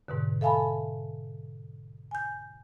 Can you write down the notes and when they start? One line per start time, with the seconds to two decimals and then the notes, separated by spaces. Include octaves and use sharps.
0.08 G#2 B2 D3
0.41 A4 E5 F5 G#5 A5 B5
2.11 G#5 G6